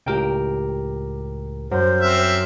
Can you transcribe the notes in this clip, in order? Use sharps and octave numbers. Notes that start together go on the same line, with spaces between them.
C#2 A2 G4 A#4 G5
F#2 C5
C4 E5 F6